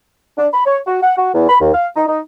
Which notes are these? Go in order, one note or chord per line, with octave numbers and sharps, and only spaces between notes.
D4
B5
C#5
F#4
F#5
F#4
E2
B5
D#2
F5
D#4
D#4